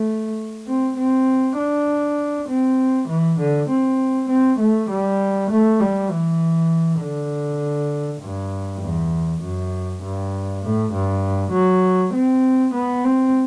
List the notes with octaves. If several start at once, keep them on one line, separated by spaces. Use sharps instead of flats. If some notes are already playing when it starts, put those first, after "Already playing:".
Already playing: A3
C4
C4
D4
C4
E3
D3
C4
C4
A3
G3
A3
G3
E3
D3
G2
E2
F#2
G2
A2
G2
F#3
C4
B3
C4